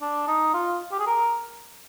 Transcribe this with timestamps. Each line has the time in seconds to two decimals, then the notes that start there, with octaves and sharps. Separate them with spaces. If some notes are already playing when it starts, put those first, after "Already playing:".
0.01 D4
0.27 D#4
0.54 F4
0.92 G4
0.99 G#4
1.07 A#4